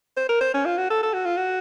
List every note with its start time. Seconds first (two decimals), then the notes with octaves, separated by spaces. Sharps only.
0.17 C5
0.29 A#4
0.41 C5
0.54 C#4
0.66 F4
0.78 F#4
0.90 A4
1.03 A4
1.14 F#4
1.25 F4
1.37 F#4